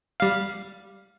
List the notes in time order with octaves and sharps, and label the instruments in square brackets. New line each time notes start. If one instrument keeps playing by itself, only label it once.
[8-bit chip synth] G3 F5